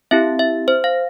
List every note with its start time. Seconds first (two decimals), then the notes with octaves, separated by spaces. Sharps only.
0.11 C4 E4 G4 E5
0.39 E5
0.68 C5
0.84 F5